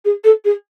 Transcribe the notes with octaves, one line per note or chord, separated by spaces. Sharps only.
G#4
A4
G#4